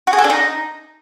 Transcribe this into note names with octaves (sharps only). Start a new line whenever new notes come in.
F#4
G#4
A4
D4
D#4